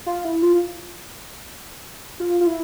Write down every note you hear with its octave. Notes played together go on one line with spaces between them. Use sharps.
F4
E4
F4
F4
F4
E4